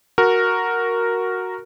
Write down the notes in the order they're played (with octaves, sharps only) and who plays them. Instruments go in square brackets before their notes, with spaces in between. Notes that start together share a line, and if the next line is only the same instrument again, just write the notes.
[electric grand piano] F#4 A#4